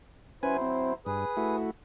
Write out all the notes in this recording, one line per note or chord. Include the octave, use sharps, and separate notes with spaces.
F#3 C#4 E4 B4 C5 G#5
C4
G2 G#4 B4 D#6
A3 E4 F#4